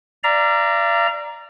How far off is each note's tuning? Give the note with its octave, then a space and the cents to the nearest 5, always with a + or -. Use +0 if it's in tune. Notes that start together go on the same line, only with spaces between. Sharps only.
D5 +0 F5 -45 A#5 +0